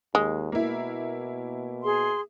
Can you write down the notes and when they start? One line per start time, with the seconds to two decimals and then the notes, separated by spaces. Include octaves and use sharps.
0.15 D#2 G#3
0.52 B2 A#3 E4
1.84 G#4 C6